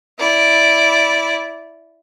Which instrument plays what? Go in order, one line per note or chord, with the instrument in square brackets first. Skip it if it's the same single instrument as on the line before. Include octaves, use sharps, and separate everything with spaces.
[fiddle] E4 D5